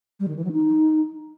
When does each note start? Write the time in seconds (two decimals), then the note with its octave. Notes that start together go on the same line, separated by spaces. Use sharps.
0.20 G3
0.28 D#3
0.36 E3
0.44 F#3
0.52 D#4